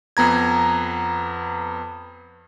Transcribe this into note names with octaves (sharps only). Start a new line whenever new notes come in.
F2 B3 A#5 G#6